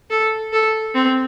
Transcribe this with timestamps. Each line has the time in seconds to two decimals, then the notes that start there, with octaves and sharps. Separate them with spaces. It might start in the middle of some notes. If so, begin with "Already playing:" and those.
0.10 A4
0.53 A4
0.95 C4